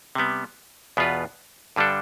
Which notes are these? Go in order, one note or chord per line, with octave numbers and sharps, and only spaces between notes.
C3 G3 B3
E2 B2 B3 F4 B4
G2 D3 G3 D4 A4